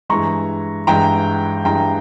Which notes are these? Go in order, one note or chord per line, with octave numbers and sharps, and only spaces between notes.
G2 E3 G#3 A#5 C#6
G2 E3 G#3 G5 A#5
G2 E3 G#3 G5 A#5